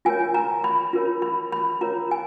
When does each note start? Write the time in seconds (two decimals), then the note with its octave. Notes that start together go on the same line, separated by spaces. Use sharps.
0.05 F4 A#4 C#5 G#5
0.34 A#5
0.64 B5
0.93 F4 A#4 C#5
1.22 B5
1.52 B5
1.81 F4 A#4 C#5 A#5
2.11 G#5